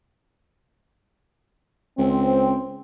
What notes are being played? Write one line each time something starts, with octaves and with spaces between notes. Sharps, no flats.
C#2 C4